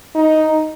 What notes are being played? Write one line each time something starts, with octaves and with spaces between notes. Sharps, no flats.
D#4